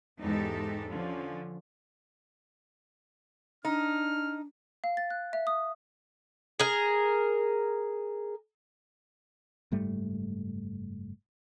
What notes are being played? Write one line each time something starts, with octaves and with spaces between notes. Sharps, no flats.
E2 G#2 G#3 D#4 G4 A4
D3 F3 C#4
D4 D#4 F6
F5
A6
F#6
E5
D#6
G#4 A#4
F#1 G#2 G3 A3